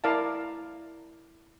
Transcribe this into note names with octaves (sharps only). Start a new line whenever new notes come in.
E4 A#4 D5 F5 A5